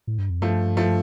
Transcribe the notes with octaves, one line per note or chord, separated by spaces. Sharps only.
A2
G2
F2
G2 F3 A3
F3 A3